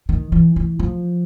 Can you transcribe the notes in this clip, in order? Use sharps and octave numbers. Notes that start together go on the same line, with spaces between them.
D#3
E3
E3
F3